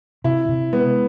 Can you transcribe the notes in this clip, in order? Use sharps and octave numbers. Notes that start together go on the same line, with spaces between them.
C3 E4
C3
G#3 B3